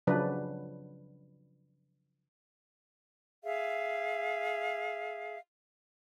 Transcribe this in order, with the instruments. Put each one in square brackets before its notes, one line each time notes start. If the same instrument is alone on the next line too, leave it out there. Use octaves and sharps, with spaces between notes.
[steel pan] C#3 F3 F#3 D4 B4
[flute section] G#4 E5 F5